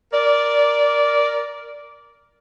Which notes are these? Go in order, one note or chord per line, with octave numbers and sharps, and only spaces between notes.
A#4 D5